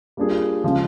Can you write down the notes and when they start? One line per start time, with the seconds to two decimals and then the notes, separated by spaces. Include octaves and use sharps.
0.17 G3 A#3 D4 F4 G#4
0.64 C#3 F3 G#3